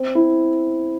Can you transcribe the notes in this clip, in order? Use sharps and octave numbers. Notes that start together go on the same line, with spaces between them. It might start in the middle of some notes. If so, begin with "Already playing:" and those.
Already playing: C4
E4